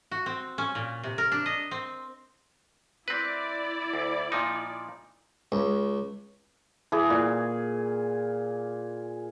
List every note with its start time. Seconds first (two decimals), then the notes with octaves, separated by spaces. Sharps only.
0.11 F#4
0.26 C4
0.58 C#4
0.75 A#2
1.03 C3
1.18 A#4
1.32 D4
1.46 D#5
1.71 C4
3.08 C4 E4 B4 D5
3.94 D2
4.32 A#2 F3 D#4
5.52 C#2
6.92 E3 G#4
7.10 A#2